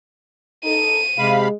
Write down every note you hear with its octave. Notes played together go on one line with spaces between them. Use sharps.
D#4 A4 D#7
C3 G#3 F5 B5